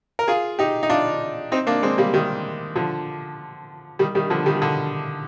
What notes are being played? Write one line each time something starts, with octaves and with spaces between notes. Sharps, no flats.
A#4
F4 G#4
D#4 G4
D#4
D4 F4
C4 D#4
A#3 D4
G#3 C4
G3 A#3
D#3 G3
D3 F3
D#3 G3
D#3 G3
D3 F3
D#3 G3
D3